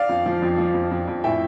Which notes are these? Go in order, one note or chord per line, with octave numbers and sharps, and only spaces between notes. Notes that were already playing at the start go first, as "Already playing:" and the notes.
Already playing: D5 F5
F2
F3
F2
F3
F2
F2
F2
A2 E5 G5